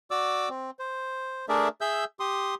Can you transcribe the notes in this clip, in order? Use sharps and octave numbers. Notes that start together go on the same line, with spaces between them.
F#4 D5 D6 E6
C4
C5
A3 D4 G#4 A#4 D5 E5
G#4 E5 E6 G6
G4 C6 D#6